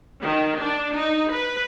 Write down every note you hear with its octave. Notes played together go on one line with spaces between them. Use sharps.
D#3
D4
D#4
B4